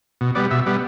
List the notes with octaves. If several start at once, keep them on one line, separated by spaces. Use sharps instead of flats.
B2
G3 B3 D5
B2 E5
G3 B3